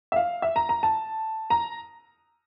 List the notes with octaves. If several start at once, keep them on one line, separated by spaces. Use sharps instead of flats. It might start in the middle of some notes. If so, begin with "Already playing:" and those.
E5
F5
E5
A#5
A#5
A5
A#5